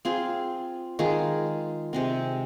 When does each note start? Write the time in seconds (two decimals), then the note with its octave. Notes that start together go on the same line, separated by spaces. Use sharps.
0.05 C4 F4 G#4
0.99 D#3 G#3 F4 G#4
1.93 C3 G#3 C4